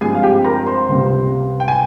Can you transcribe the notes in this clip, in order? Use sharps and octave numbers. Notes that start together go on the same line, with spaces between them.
G2 F3 G#3 C4 G#4 G#5
F5
G4 G5
A#4 A#5
C5 C6
C#2 C3 G3 C4
G5
G#5